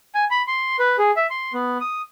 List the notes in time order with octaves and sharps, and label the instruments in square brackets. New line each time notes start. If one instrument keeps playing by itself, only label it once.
[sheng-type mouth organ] G#5
B5
C6
B4
G#4
E5
C6
B3
D#6